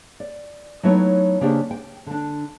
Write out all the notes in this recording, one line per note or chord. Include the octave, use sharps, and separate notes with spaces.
D5
F#3 A3 B3 D#4 E4 C#5
C#3 A#3 C#4 D4 G4 C5
G5
D3 D4